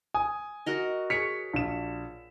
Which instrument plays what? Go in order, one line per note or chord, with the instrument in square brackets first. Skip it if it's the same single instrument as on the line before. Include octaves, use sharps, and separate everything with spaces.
[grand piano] G#5 D#6
[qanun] F#4 A#4 D#5
[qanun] G#4 C#5 [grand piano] B6 C#7
[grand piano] A#1 E7